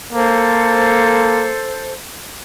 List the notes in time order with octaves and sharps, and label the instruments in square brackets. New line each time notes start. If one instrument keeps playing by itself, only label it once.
[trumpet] A#3 [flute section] A4 C5